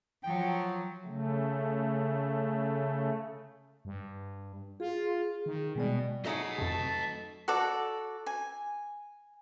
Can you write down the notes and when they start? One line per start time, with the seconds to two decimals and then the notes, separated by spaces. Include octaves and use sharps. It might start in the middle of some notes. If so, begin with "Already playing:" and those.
0.24 F3 F#3 G5
1.05 C#3 A3
3.85 G2
4.80 F4 G#4
5.46 D#3
5.76 B2 G3 G#3 D5
6.25 F#3 A3 D#4 G#4 D#5 F#5 B6 C#7
6.58 F2 C3 A5
7.48 F#4 A4 D5
8.26 G#5